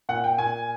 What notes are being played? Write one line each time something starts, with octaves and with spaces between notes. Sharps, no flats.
A#2 F#5
G5
A#2 G#5